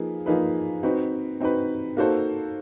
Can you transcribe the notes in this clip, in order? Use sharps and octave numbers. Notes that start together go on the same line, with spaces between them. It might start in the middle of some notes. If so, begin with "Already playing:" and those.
Already playing: F3 A#3 D#4 G#4 B4
F3 A#3 D#4 G#4 B4
C4 D#4 F#4 B4
C4 D#4 F#4 B4
A#3 D#4 F#4 A4 C5